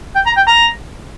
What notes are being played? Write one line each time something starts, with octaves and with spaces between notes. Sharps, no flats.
G5
A#5
G5
A#5